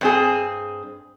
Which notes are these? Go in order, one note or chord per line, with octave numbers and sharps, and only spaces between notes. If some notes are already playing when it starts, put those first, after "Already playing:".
G2 C4 G#4